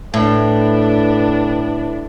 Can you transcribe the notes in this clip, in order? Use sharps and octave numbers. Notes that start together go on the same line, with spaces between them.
A2 D4 B4